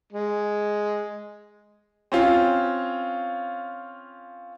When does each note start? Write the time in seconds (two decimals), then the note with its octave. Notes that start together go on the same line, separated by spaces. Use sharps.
0.13 G#3
2.12 C4 C#4 F4